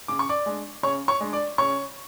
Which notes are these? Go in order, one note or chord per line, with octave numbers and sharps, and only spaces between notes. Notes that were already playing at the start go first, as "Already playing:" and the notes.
C#3 D6
C#6
D5 D6
G#3 D4
C#3 C#5 C#6
C#5 C#6
G#3 D4
D5 D6
C#3 C#5 C#6